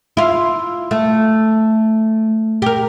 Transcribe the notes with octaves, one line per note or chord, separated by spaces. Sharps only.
E4 F4
A3
G4 A#4